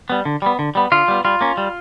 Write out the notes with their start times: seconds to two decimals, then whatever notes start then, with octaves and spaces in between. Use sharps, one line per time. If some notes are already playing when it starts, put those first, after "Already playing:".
0.10 G3 B3
0.25 D3
0.42 G3 B3
0.59 D3
0.75 G3 B3
0.92 D3 F4
1.08 G3 B3
1.25 G3 F4
1.41 A#3 C#4
1.57 G3